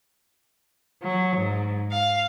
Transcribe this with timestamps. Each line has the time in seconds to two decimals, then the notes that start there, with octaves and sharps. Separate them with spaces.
1.02 F#3
1.35 G#2
1.91 F5